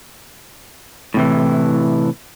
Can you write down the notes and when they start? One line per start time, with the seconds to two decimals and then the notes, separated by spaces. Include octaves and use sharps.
1.14 A2 C3 E3